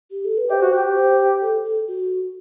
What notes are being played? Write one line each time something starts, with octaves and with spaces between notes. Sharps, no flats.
G4
A4
B4
G4 C5 E5
F#4
G4
C5
A4
A4
F#4